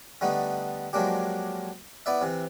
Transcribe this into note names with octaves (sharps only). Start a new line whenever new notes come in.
D3 G3 A3 B3 D#4
F3 F#3 G#3 A#3 D4 G4
B3 E4 D5 E5
C3 E3